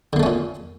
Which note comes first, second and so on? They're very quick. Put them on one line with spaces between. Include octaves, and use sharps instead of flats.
D3 A#3 A3 C#4 A#2